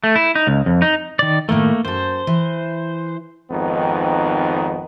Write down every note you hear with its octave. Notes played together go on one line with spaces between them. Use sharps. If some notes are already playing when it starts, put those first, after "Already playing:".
A3
E4
D#4
C#2
F2
D#4
D#3 D5
A2 D#3 A3 A#3
F#2 A4 C5
E3
G#1 F2 D#3 B3 D#4